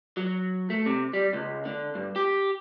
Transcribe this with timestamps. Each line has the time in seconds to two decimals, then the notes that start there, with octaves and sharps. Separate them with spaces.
0.17 F#3
0.70 A3
0.86 C3
1.13 G3
1.33 C#2
1.65 D3
1.95 G2
2.16 G4